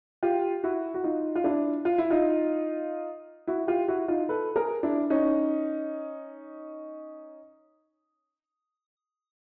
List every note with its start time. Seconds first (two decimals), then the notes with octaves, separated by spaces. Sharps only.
0.23 F4 G4
0.64 E4 F#4
0.94 F#4
1.04 D#4 F4
1.35 F4
1.44 D4 E4
1.85 F4
1.98 E4
2.10 D#4 F4
3.47 E4 F#4
3.67 F4 G4
3.88 E4 F#4
4.08 D#4 F4
4.29 A4 B4
4.56 G#4 A#4
4.83 D4 E4
5.10 C#4 D#4